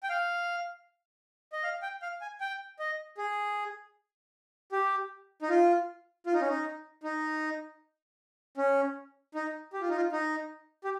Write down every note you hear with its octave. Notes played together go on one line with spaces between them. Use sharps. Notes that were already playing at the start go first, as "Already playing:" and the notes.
G5
F5
D#5
F5
G5
F5
G#5
G5
D#5
G#4
G4
D#4
F4
F4
D#4
C#4
D#4
D#4
C#4
D#4
G4
F4
D#4
F4
D#4
G4